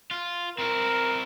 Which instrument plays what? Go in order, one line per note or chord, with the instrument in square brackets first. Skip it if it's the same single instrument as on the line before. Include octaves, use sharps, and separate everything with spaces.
[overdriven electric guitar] F4
[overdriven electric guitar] C4 E4 [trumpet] A#4